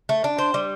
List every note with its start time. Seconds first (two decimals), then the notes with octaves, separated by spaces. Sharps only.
0.09 A3
0.24 D4
0.38 C5
0.54 G3